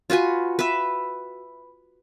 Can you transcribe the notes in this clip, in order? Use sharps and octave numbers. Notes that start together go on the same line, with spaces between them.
F4 F#4 B4 G#5
B4 E5